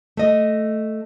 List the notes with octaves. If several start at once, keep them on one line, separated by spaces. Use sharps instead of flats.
A3 D#5